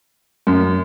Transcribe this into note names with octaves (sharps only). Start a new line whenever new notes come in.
F#2